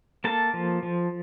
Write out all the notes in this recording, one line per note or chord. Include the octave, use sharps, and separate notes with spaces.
A#3 A4 A5
F3
F3